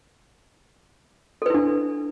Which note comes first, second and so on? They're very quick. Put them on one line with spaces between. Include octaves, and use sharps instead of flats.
A4 B4 E4 D4